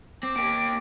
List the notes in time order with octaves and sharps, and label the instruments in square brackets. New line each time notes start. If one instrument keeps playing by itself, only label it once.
[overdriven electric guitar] C4 [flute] D6
[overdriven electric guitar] A#3 G4 [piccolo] D7